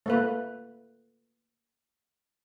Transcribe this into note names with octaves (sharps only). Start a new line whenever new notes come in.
A3 A#3 B4